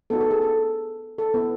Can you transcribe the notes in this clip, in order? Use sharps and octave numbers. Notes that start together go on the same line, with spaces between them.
B3 D#4 F#4 A4
A4
G#4
A4
A4
B3 E4 B4